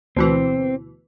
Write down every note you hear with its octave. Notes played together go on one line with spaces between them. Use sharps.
D2 B2 E3 C4